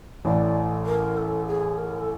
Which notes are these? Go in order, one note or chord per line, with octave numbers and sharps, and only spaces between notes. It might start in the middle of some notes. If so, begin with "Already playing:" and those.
A1 A2 E3 D5
A#4
A4
G#4
A#4
A4